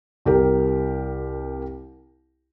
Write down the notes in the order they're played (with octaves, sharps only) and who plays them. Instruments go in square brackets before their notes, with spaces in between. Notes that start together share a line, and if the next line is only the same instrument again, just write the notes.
[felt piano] C2 G4 A#4